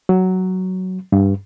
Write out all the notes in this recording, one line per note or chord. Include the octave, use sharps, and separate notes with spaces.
F#3
G2